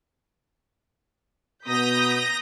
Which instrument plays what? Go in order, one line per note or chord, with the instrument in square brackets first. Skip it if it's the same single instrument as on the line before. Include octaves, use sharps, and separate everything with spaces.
[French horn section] B2 B3 [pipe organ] A#5 A#6 [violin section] D#6 G6 B6